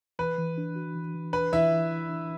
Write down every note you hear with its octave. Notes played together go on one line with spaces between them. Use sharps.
E3 B4
E3
D4
F#4
E3
E3
D4 B4
E3 E4 E5
E3
E3
D4